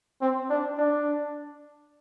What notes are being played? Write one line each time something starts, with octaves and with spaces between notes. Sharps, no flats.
C4
D4
D4